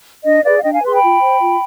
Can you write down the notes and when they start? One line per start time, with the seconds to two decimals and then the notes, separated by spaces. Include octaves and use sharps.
0.25 D4 D#5
0.44 G#4 B4 D5 F5
0.57 F5
0.64 D4 D#5 G5
0.73 F5 G#5
0.83 G#4 B4 C6
0.93 G5 B5
1.02 F4
1.21 C5
1.41 F4